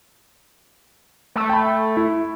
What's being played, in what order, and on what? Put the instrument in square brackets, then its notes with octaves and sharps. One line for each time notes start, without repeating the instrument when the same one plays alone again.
[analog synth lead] A3
[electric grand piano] G5 B5
E4